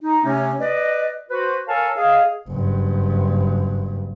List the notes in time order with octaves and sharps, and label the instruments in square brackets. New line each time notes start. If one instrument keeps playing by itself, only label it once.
[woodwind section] D#4
C3 A3 C#4
B4 D5 D#5
F#4 B4 C5
A4 A#4 C#5 F5 G#5 A5
G#4 D#5 F5
[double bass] F#1 G2